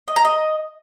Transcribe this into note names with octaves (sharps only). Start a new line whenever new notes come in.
D#5
A#5
D#5